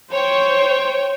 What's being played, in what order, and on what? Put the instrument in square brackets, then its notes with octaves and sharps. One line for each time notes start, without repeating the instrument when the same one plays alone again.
[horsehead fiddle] C5 [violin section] C#5 G5